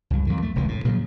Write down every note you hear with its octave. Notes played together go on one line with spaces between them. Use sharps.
C#2 G2
F2 D#3
A3
F1 C#2 D3
A2
A#2 C#3 F3 F#3